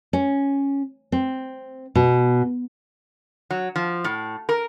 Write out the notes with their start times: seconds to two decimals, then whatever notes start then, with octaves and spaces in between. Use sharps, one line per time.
0.13 C#4
1.12 C4
1.95 B2
3.51 F#3
3.76 F3
4.04 A2
4.49 A#4